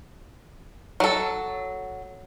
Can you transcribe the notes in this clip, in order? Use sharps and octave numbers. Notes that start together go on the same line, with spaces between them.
F#3 A4